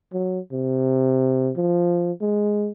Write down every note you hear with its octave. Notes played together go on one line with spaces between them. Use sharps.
F#3
C3
F3
G#3